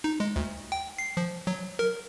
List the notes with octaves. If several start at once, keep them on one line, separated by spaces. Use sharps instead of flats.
D#4
G#3
D2
G5
C7
F3
F#3
A#4